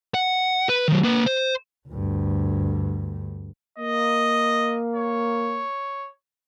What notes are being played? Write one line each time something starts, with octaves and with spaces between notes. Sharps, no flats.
F#5
B4
D#3 F#3
A#3 B4
C5
D2 G2
A#3 D#5
C#5